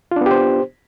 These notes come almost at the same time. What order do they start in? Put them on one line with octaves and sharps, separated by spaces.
F4 D4 B3 G4 C5